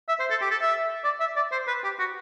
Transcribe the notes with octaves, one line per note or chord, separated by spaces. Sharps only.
E5
C5
A4
G4
A4
E5
D5
E5
D5
C5
B4
G4
F#4